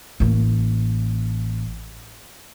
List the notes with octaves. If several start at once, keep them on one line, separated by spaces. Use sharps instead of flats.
A1 A#3